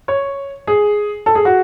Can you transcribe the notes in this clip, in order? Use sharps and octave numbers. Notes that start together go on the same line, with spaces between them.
C#5
G#4
A4
G#4
F#4